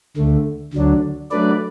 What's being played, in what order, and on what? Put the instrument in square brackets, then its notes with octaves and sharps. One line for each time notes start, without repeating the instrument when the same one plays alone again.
[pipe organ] D2 D3 A3
D2 D3 F#3 D4
F#3 A3 D4 B4 D5